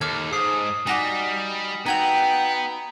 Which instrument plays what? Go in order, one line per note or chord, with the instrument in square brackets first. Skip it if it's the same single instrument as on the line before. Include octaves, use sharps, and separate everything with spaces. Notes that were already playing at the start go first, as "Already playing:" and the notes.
[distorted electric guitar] D#2 [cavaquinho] A4 [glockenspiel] D6 F6 G#6
[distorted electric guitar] G#2 [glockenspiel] D#6 C7
[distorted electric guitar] G3 [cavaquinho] D#4 F#4 D6 [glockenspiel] G#5 A#6 G7
[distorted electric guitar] B3 [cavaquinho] D#4 F#4 E5 [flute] G5 [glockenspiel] A#5 G#6 F7